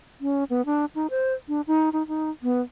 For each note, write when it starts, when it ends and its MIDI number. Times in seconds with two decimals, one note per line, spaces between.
0.21 0.44 61
0.50 0.65 59
0.66 0.85 62
0.95 1.07 63
1.10 1.34 72
1.49 1.61 62
1.67 1.89 63
1.93 2.06 63
2.08 2.30 63
2.43 2.61 59